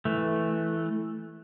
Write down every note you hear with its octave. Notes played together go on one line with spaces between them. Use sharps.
E3 A3